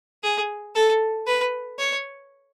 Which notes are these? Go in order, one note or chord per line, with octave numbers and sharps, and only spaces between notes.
G#4
A4
B4
C#5